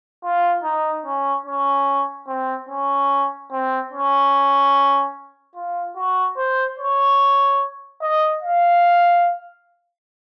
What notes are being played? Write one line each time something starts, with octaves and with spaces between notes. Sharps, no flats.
F4
D#4
C#4
C#4
C4
C#4
C4
C#4
F4
F#4
C5
C#5
D#5
F5